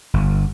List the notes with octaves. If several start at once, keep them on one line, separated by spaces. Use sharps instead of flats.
G1